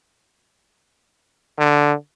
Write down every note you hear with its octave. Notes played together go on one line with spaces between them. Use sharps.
D3